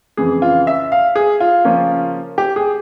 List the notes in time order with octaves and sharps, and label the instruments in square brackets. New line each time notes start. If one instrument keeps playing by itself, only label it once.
[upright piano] F2 C#3 E3 G#4
F4
E5
F5
G#4
F4
C#3 F3 A#3 C#4
G4
G#4